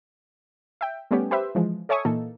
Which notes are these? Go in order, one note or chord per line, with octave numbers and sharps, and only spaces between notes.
E5 G5
G3 A3 B3 C#4 G4
G4 B4 C5 E5
E3 F3 G#3
A4 C#5 E5 G#5 C#6 D#6
A#2 E3 A#3 D#4 A4